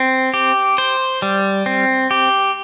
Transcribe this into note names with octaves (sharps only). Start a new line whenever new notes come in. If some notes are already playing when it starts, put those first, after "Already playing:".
Already playing: C4
G4
C5
G3
C4
G4